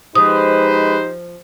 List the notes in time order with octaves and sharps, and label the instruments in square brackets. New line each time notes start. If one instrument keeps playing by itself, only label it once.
[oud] F3 [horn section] G#3 B4 [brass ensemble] D#4 G4 C5 [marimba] D#6